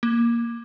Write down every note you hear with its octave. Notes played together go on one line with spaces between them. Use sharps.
A#3